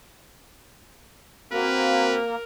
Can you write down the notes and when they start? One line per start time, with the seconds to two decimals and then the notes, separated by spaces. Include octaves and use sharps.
1.52 A#3 C4 F#4 A#4 B4